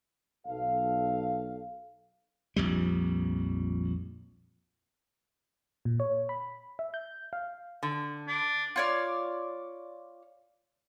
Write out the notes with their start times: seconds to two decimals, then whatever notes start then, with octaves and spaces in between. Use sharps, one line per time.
0.46 B1 A4 F5
2.56 A#1 F2 G3
5.85 A#2
6.00 C#5
6.29 B5
6.79 E5
6.94 G6
7.33 F5
7.83 D3
8.28 D4
8.76 F4 C#5 D5